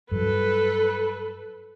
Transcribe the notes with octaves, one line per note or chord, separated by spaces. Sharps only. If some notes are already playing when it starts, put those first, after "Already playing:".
G2 F#3 A4 B4